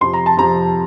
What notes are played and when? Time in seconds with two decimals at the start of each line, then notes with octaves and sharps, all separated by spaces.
0.01 F2 C3 F3 C6
0.14 A#5
0.26 A5
0.37 F2 C3 F3 A#5